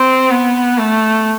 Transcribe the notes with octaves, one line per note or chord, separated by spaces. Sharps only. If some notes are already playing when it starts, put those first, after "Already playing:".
Already playing: C4
B3
A3